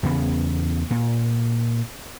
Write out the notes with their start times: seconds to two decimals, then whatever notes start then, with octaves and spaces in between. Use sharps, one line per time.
0.03 E2 C#3 B3
0.91 A#2